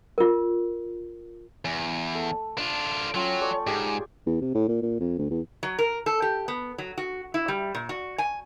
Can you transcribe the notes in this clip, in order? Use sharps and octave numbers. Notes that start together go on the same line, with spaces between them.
F4 A#4
E2
A3
D4 F4
F#3 C#4 F4 G5
A3 D5 C#6
G#2 G4 G#4 G#5
E2
C3
A2
A#2
A#2
F2
D2
E2
F#3
A#4
A4
G4
B3
F#3
F#4
E4
G3
A#2
F#4
G#5